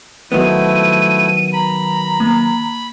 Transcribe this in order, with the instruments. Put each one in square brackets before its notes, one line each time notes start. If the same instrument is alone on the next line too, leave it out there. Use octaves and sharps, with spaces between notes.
[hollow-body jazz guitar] D#3 F#3 B3 [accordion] F3 A3 E4 [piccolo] D#7
[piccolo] A#5 [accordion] B5
[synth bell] A#3